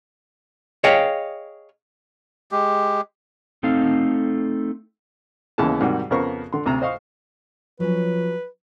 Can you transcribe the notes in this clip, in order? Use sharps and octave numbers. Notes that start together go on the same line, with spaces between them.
G#4 C#5 D#5 F5 G5
G#3 G4
A3 C4 D#4 A4 F5
D#2 C#3 E3 G#3 B3 A5
G#2 C3 D#3 G3 F#4
F2 C#3 B3 A#4 C5 C#6
D3 C6
D2 C3 A#5
C5 D#5 F5 C#6
F3 F#3 C#4 B4